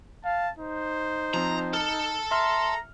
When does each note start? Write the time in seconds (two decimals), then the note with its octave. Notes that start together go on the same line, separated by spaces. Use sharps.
0.25 F5 A5
0.59 D#4 C5
1.34 F3 C4 A#5
1.73 A4 F6
2.31 E5 A#5 C6 F6